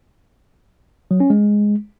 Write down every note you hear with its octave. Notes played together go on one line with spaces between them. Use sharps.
F#3
C#4
G#3